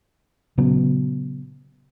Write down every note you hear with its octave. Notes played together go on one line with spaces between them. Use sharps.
A#2 C#3 F#3 B3